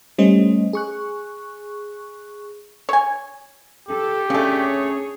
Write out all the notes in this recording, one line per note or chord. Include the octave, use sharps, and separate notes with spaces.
G3 A3 C#4 C5 D#5
G#4 C#6 F#6
C#5 G#5
G4 A4
C#3 A3 C#4 D4 G#4 C#5